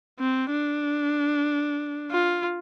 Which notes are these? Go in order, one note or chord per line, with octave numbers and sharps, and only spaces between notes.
C4
D4
F4